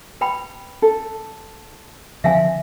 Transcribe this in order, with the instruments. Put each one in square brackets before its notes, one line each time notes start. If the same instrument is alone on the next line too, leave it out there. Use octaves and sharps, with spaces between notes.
[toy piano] B4 G5 B5
[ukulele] A4
[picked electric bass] D3 F3 C4 [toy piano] E5 F5 G#5